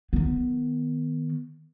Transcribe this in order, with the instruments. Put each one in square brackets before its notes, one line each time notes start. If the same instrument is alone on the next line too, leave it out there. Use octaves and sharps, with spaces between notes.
[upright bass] D#3 B3